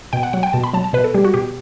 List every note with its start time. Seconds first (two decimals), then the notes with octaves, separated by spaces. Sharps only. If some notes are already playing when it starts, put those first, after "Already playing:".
0.13 B2 G5
0.23 F#5
0.33 F#3 F#5
0.43 G5
0.53 B2 A5
0.64 B5
0.73 F#3 A5
0.84 A5
0.93 B2 B4
1.04 A4
1.14 G3 G4
1.25 F#4
1.34 B2 G4